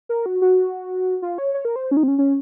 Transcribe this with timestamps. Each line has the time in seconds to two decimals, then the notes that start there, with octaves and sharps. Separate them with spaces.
0.09 A#4
0.26 F#4
0.42 F#4
1.22 F4
1.38 C#5
1.54 C#5
1.65 A#4
1.76 C5
1.91 C#4
1.97 D#4
2.03 C4
2.08 C#4
2.18 C#4